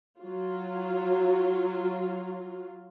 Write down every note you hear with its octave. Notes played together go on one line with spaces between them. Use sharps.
F#3 F4